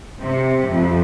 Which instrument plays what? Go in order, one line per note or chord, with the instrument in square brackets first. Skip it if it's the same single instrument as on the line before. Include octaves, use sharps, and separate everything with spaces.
[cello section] C3
F2